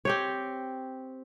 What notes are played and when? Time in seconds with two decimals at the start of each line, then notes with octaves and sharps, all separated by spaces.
0.05 C4 G4 C#5